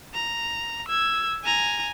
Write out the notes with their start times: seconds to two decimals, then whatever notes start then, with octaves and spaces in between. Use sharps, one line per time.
0.14 A#5
0.88 E6 G#6
1.44 G#5 A#5